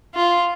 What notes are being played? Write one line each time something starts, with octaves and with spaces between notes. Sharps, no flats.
F4